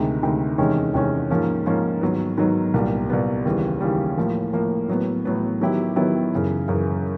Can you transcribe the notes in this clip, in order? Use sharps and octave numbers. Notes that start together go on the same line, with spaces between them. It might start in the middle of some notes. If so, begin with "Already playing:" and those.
Already playing: D2 C3 D#3 G#3
D2 C3 D#3 G#3
E2 C3 D#3 G#3 C#4
E2 C3 D#3 G#3 C#4
G#2 F3 A#3 C#4
G#2 F3 A#3 C#4
G#2 D#3 F#3 B3
G#2 D#3 F#3 B3
C2 A#2 G3 B3
C2 A#2 G3 B3
D#2 C#3 E3 G3
D#2 C#3 E3 G3
A2 F3 A#3
A2 F3 A#3
A2 F#3 B3
A2 F#3 B3
D#3 F#3 B3 E4 G4
D#3 F#3 B3 E4 G4
F#2 C#3 E3
F#2 C#3 E3